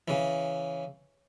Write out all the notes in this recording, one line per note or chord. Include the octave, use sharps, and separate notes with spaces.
C#3 E3